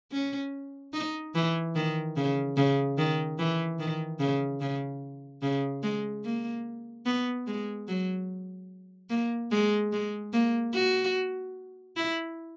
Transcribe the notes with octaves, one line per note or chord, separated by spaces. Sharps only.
C#4
D#4
E3
D#3
C#3
C#3
D#3
E3
D#3
C#3
C#3
C#3
G#3
A#3
B3
G#3
F#3
A#3
G#3
G#3
A#3
F#4
E4